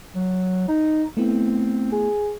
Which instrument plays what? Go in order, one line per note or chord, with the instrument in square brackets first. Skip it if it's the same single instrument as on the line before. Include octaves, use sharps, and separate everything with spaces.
[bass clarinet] F#3
D#4
[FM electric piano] A3 B3 E4 [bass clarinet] C4
[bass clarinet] G#4